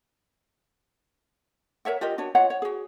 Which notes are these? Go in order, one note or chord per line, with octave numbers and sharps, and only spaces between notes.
A#4 C#5 E5 F#5
F4 G4 A#4 D#5
D4 F#4 C#5
F4 C#5 D#5 F#5
C#5
F#4 G#4